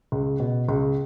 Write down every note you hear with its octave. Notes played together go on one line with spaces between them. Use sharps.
C#2
B2
C#2